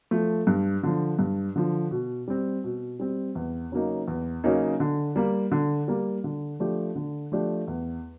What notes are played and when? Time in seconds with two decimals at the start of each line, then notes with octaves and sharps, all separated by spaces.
0.11 F3 A3
0.47 G2
0.83 D3 F3
1.19 G2
1.56 D3 F3
1.91 B2
2.28 G3 C4
2.64 B2
3.00 G3 C4
3.35 E2
3.72 C#3 F#3 A#3 D#4
4.08 E2
4.44 C#3 F#3 A#3 D#4
4.80 D3
5.16 G3 A#3
5.52 D3
5.88 G3 A#3
6.24 D3
6.60 F3 A3 D4 G4
6.95 D3
7.32 F3 A3 D4 G4
7.68 E2